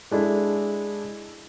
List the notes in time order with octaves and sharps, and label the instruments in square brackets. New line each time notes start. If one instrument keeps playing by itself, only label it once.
[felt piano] G#3 D4 E4 A4